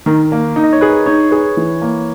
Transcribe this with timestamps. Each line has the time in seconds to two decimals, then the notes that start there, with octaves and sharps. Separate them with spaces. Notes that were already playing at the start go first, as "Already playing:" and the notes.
0.06 D#3 A#4
0.32 A#3
0.56 D#4
0.64 D#5
0.73 C#5
0.81 G#4 B4
1.06 D#4 C#5
1.31 G#4 B4
1.57 E3
1.81 A#3